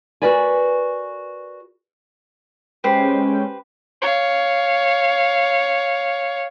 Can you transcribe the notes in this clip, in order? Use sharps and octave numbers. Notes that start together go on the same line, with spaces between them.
F#4 G4 A#4 B4 D5 G#5
G#3 C#4 G4 B4 C5 G5
C#5 F5